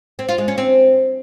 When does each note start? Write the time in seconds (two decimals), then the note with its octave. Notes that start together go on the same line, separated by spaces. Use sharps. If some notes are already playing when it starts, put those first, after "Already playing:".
0.19 C4
0.28 F4
0.38 G#3
0.48 C#4
0.58 C4